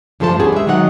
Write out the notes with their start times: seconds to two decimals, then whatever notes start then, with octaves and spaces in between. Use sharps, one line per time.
0.20 G2 F3 A3 A4 C5 A5
0.39 B3 C#4 G4 G#4
0.52 G#3 E5
0.67 D#3 F#3 G#3 D#4 D#5 F#5